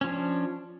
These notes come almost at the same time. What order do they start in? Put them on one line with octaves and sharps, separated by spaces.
C#4 F3 D4